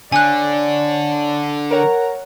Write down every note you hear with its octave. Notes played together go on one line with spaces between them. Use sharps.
D3 C#5 D5 G#5 F#6
A#4 C#5 F#5 A#5